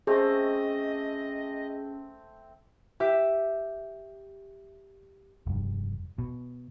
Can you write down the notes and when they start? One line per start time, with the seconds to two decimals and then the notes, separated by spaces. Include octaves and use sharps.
0.07 A3 C4 C#4 G#4 D#5
3.00 G4 E5
5.46 F1 G2
6.18 B2